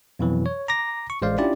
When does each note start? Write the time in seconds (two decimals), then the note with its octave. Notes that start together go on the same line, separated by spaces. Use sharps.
0.19 F2 B2 E3 F#3
0.46 C#5
0.68 A#5 D6 A#6
1.10 C#6
1.22 A1 G#3 C5 D5 F5
1.38 C#4 D4 E4 F4 G4 D5